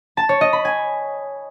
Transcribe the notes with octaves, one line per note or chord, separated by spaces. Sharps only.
A5
C#5
D#5
B5
G#5